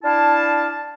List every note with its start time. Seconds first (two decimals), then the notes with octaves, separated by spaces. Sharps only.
0.03 D4 E4 F5 A5